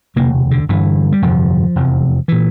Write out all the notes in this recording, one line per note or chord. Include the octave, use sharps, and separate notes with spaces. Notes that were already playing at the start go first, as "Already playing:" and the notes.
E1 D2 C3 A#3
D3
G1 G2 D3 E3
G3
G1 F2 C3 F3
F1 E2 C3
A#2 E3